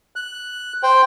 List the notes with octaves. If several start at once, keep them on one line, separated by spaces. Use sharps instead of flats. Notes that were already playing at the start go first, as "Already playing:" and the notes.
F#6
C5 G5